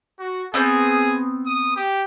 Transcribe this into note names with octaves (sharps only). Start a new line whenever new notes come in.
F#4
B3 C4 G#4 G6
D#6
G4